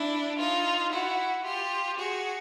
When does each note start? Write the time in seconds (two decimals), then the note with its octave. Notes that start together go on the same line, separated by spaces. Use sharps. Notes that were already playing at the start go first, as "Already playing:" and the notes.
Already playing: D4 E4
0.38 D#4 F4
0.91 E4 F#4
1.44 F4 G4
1.97 F#4 G#4